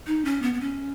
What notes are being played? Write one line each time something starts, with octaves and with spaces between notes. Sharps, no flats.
D#4
C#4
B3
B3
C#4